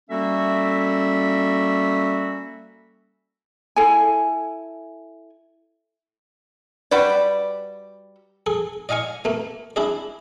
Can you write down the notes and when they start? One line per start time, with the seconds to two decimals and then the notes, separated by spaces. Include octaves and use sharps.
0.10 G3 A#3 C#4 F#4 A4 E5
3.76 E4 A4 G#5
6.91 G3 F#4 B4 D5
8.46 G#4 A4
8.89 D5 D#5 F5 G#5 C#6
9.25 A3 A#3
9.76 D4 E4 G#4 D5